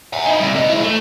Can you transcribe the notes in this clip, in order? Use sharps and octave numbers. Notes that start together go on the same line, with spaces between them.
E5 F#5
D#4 E4
C3 G3
C3 D#5
G#3 E4
A3